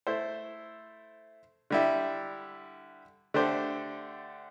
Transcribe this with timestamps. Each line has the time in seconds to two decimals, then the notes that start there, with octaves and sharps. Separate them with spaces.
0.07 A3 E4 C5
1.70 D3 G3 E4
3.34 D3 A3 D4 G4 C5